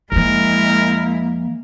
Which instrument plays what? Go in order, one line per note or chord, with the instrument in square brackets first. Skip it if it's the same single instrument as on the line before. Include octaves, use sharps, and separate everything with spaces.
[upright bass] F2 F3 [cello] G#3 E4 [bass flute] A#3 [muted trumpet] A#4